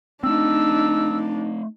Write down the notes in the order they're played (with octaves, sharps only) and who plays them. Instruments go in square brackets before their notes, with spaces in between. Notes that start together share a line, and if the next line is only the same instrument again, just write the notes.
[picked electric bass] A3 C4 [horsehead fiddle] D4 D#4 [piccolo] E6